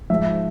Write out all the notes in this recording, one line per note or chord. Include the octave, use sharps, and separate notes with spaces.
G#2 F3 E5